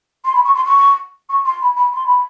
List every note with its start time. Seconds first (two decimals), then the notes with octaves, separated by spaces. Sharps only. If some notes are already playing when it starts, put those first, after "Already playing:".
0.25 C6
0.34 B5
0.45 C#6
0.55 C6
0.66 C#6
1.29 C#6
1.45 C6
1.62 B5
1.77 B5
1.93 C6
2.05 B5